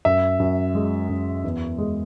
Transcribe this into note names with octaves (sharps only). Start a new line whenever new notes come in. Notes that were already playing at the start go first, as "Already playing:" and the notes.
F#2 E5
F#2
G#3
F#2
E2
G#3